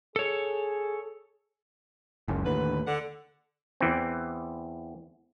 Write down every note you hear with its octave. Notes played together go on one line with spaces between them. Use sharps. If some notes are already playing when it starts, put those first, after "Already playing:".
G#4 A4 C#5
F#1 C#2 F#2
D#2 A2 D3 B4
D3 F#5
E2 E3 C4